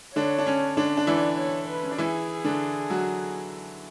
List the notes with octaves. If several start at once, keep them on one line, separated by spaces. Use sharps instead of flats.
D3 D4 C#5
D4
C#4
D3 D4
D4
E3 E4 D5
C#5
B4
C#4
D4
E3 E4 G#4
D3 D4
F#3 F#4